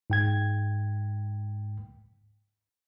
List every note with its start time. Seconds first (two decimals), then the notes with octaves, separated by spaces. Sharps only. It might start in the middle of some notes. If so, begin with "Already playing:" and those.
0.10 G#2 G5 G#6